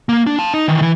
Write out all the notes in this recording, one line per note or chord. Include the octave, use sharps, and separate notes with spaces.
A#3
D4
F5 A5
D#4
D#3 E3
E3